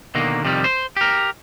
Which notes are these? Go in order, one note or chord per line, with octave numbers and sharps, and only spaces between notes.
B2 D3 D#3 A#3
F2 C3 D#3 G3
C5
G4 A#4